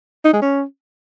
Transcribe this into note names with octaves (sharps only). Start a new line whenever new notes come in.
D#4
G#3
C#4